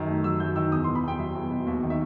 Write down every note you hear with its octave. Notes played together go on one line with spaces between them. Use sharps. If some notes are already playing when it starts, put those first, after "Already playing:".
Already playing: F#2 D#3
A3
F#3 E6
F#2 G6
D#3 E6
E2 D#6
C6
B2
B5
E2 G5
F#3 E5
E2
B2
D#2 E5
D#3
E5